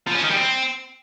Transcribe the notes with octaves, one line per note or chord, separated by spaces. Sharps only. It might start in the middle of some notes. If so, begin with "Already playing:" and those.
F3
C#4
D#3
G3
C4